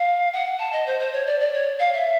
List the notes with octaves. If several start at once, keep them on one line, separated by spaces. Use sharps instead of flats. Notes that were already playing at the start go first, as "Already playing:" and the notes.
Already playing: F5
F#5
A5
D#5
C5
C5
C#5
D5
D5
C#5
F5
E5